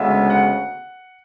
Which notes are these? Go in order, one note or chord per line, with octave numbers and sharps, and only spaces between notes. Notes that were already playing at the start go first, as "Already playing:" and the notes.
Already playing: D2 C#3 G#3 B3 E5
F#5